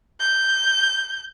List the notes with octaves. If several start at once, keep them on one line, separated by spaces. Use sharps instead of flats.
G6